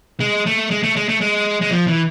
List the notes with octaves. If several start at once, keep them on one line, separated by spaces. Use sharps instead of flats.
G#3
A3
G#3
A3
G#3
A3
G#3
G#3
F3
E3